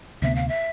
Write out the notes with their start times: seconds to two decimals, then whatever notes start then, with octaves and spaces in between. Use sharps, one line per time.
0.22 D2 C3 G3 B3 E5
0.35 F5
0.48 E5